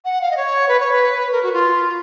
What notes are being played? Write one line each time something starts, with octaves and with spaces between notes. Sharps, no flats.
F#5
F5
D#5
C#5
B4
C#5
B4
A#4
F#4
F4